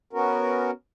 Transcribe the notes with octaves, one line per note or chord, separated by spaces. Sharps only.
B3 C#4 F#4 A#4